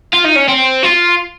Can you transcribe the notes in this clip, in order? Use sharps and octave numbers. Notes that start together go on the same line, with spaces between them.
F4
D#4
C#4
C4
F4